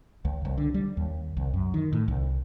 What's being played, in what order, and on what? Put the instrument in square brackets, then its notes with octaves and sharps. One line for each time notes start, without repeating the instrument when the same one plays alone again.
[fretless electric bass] C#2
C2
D3
G3
D#2
C2
F#2
D#3
A2
C2